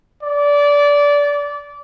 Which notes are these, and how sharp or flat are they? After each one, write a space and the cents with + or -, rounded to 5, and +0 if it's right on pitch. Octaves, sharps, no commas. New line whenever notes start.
D5 -20